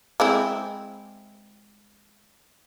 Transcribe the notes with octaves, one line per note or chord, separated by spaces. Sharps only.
G#3 C4 E4